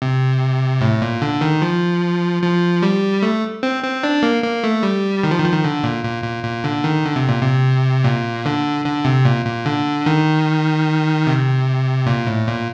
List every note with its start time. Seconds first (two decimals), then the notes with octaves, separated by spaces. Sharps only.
0.02 C3
0.81 A2
1.02 A#2
1.22 D3
1.41 D#3
1.62 F3
2.43 F3
2.83 G3
3.22 A3
3.63 C4
3.84 C4
4.03 D4
4.23 A#3
4.44 A#3
4.64 A3
4.83 G3
5.23 D#3
5.31 F3
5.39 D#3
5.46 F3
5.52 D#3
5.64 D3
5.83 A#2
6.04 A#2
6.23 A#2
6.44 A#2
6.64 D3
6.84 D#3
7.05 D3
7.16 C3
7.29 A#2
7.41 C3
8.04 A#2
8.46 D3
8.85 D3
9.05 C3
9.25 A#2
9.45 A#2
9.66 D3
10.06 D#3
11.27 C3
12.06 A#2
12.27 A2
12.47 A#2